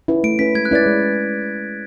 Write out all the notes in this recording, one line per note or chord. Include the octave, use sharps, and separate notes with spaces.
C#4 E4 B4
A3 D7
C#4 E4 B4 B6
G#3 G#6
F#6
C#4 E4 B4 D5 A6
G#3